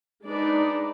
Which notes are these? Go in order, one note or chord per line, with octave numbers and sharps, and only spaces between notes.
G#3 D4 D#4 B4 D5